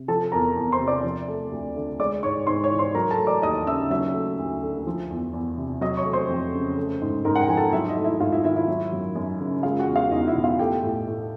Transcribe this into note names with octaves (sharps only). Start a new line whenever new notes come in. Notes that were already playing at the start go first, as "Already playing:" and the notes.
Already playing: C3
F3 A4 A5
E2 A#4 A#5
E2
C5 C6
C3
D5 D6
F3
A3
D2
D3
G#3 D5 D6
G#2 C#5 C#6
G#2 C5 C6
C#5 C#6
E3
C5 C6
F#3 A#4 A#5
A4 A5
A3
D5 D6
D#2 D#5 D#6
C#3 E5 E6
F#3 E5 E6
A3
D2
D3
F3
E2
E2
C3
F#3 D#5 D#6
C#5 C#6
A3
C5 C6
F2
C#3
A3
G#2
G#2 A#4 A#5
F#5
G5
F3 G#5
A4 A5
F#3 E4 E5
D#4 D#5
A3
E4 E5
G#2 F4 F5
E4 E5
D#3 E4 E5
E4 E5
F#3
F#2
F#2
C#3
G#3 F4 F5
F#4 F#5
E2
F4 F5
E2 D#4 D#5
E4 E5
B2
F4 F5
A3 G4 G5
A2
A2